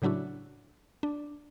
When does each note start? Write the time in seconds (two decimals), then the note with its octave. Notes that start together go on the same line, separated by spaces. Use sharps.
0.02 A2 C#3 F#3 D4 E4 F#4
1.03 D4